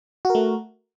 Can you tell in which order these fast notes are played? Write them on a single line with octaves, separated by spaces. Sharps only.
F#4 A#4 A3